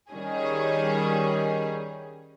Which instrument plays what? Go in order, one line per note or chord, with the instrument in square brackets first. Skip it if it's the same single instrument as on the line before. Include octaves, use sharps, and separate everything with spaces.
[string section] D#3 G3 C#4 G#4